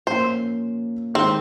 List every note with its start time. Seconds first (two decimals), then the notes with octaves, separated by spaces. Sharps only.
0.07 A#2 F3 A#3 C#4 C5
1.14 D#3 G#3 C4 D#4 G4